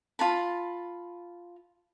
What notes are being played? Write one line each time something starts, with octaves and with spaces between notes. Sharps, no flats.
F4 A5 B5